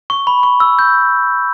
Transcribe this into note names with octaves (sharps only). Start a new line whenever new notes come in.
C#6
B5
C#6
E6
G6